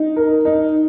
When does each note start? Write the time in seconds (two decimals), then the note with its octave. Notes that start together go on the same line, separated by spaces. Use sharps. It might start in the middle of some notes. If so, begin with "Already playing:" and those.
Already playing: D#4
0.16 A#4
0.45 D#4